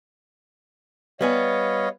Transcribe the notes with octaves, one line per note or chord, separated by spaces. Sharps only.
G3 B3 C#5 D#5 F5 G#5